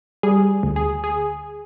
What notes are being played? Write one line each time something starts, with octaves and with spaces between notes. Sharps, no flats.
G3 G#4
D2
G#4
G#4